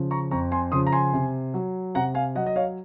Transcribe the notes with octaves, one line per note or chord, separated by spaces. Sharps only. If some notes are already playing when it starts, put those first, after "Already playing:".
Already playing: C#3 F3
A#5 C#6
F2 A#5 C#6
G#5 C6
C#3 F3 C6 D#6
A#5
G#5 C6
C3
F#3
C3 F#5 A#5
F5 G#5
F#3 D#5 F#5
D#5
C#5 F5